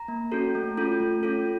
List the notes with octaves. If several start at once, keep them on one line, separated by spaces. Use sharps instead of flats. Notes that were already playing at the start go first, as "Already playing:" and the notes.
Already playing: A#5
A#3
C#4 F#4 A4
A3
C#4 F4 A4
A3
C#4 F4 A4